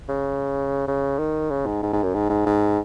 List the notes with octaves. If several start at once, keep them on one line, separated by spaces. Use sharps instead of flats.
C#3
C#3
D#3
C#3
G#2
G#2
G#2
F#2
G#2
G#2
G#2